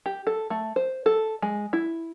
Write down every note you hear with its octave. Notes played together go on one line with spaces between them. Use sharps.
G4
A4
A3
C5
A4
G#3
E4